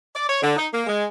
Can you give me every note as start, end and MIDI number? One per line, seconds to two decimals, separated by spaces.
0.15 0.24 74
0.28 0.39 73
0.42 0.54 50
0.56 0.67 63
0.73 0.86 58
0.87 1.03 56